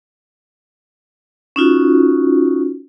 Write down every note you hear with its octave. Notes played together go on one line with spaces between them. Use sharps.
C#4 D#4 F4 F#4